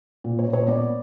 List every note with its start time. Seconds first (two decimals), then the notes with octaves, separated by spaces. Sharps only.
0.24 A#2
0.39 C#5
0.47 A#2
0.53 C#5
0.68 B3 D5